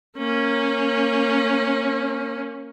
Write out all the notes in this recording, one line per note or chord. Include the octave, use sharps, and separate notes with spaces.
A#3 C#4